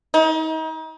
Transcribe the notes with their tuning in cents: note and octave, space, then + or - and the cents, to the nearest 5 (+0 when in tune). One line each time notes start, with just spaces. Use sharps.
D#4 +35